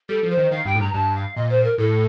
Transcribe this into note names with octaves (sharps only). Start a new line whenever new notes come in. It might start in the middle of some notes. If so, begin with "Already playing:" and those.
G3 A4
F3
C5
D#3
D#3 F5
G2 G5
A2
G2 A#5
G2 A5
F5
A#2 D#5
C5
A#4
A2 A4